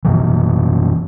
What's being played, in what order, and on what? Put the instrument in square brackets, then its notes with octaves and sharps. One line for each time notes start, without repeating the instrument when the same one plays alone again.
[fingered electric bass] F#2 B2 E3